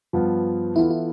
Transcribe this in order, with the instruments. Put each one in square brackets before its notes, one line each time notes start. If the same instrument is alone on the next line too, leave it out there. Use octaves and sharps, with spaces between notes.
[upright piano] G2 F3 B3 F4
[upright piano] E3 B3 F4 A4 [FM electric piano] E4
[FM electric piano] E4